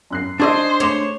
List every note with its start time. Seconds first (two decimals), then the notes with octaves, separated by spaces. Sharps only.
0.11 F#2 F#6 C7
0.40 D4 G#4 C5 D#5 C6 C#6 E6
0.80 A3 C#5 D6 E7